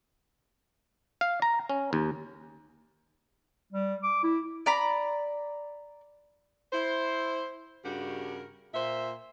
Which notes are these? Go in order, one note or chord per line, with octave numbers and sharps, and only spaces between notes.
F5
A#5
C#4
D#2
G3
D6
E4
D5 A#5 B5
E4 C5
G2 C#3 D4 F#4 G4 A#4
A#2 C5 E5